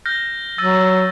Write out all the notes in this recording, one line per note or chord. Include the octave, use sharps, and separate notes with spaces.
F6 G6 A#6
F#3 E6 A6 D#7